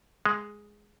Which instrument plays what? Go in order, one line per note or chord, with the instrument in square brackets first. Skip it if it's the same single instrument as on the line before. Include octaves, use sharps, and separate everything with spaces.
[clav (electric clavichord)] G#3